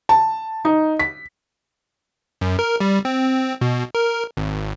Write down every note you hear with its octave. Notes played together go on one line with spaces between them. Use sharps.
A5
D#4
B6
F#2
A#4
G3
C4
B2
A#4
G#1